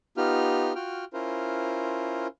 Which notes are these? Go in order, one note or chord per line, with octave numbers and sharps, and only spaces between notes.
B3 D#4 F4 G4 F6
F4 F#4 G5 F6
C#4 E4 F4 A#4 C5